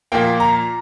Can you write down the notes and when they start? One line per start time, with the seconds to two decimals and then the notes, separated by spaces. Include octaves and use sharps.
0.12 A#2 F3 A#3 G5
0.40 A#5